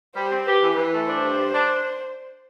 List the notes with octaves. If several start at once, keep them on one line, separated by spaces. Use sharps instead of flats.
G3 C5
C4
G4 B4
E3
E3 B4
A3
D4 C5
G2
G3
D4